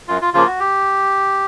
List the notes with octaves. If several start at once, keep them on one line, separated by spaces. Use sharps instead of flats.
F#2 F4
F4
C#3 F3 A#3 F4
F#4
G4